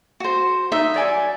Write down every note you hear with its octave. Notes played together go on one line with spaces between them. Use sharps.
F#4 C5
D#4 E5
F#3 D5 G#5